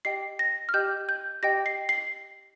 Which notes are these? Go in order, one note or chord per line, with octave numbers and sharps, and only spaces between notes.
G4 D#5 G5 C7
A#6
F6
G4 D#5 G5 G6
G6
G4 D#5 G5 A#6
C7
C7